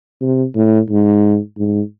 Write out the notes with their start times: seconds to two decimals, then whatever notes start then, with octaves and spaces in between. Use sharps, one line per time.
0.21 C3
0.56 A2
0.89 G#2
1.58 G#2